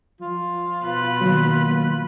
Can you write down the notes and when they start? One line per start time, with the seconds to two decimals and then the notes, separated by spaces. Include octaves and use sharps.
0.21 F3 F4
0.84 B2 B4 F#6
1.21 D#3 F#3 A#3